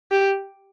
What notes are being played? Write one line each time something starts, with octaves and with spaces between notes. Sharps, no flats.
G4